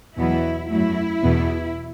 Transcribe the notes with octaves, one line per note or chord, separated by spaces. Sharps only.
E2 B2 F#3 B3 E4
F#2 F#3 A3 E4
E2 B2 B3